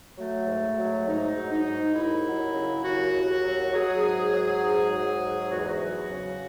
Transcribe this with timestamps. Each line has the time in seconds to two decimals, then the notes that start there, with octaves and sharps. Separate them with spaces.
0.17 F#3 A3
0.47 G#2
0.77 F#3
1.06 G#2 D#4
1.36 F#3
1.51 D#4
1.66 G#2
1.95 D#2 E4
2.25 F#3
2.54 C#3
2.84 D#2 F#4
3.14 D#2
3.43 F#3
3.73 F#3 G#4
4.02 G#2
4.32 F#3
4.62 G#2
4.91 F#3
5.20 G#2
5.50 E2 F#4
5.59 G#4
5.66 F#4
5.80 F#3
6.10 C#3